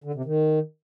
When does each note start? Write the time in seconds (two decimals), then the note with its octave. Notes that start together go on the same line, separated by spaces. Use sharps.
0.04 D3
0.15 C3
0.25 D#3